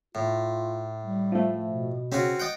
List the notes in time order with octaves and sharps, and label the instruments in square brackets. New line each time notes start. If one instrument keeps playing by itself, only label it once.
[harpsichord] A2 [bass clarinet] F4
[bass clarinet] G3
[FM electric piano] F3 A3
[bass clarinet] B2
[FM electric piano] C#3 [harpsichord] C4 C#4 F#4
[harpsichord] D#5 G5 [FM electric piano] F#5 G6 A6